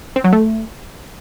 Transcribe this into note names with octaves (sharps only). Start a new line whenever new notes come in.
C4
F#3
A3